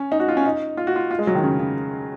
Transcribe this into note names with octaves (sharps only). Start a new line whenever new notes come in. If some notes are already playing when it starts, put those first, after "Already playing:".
Already playing: C#4
D#4
F#4
F4
C#4
D#4
F4
F#4
F4
F4
G#3
F#3
D#3
C#3
C#3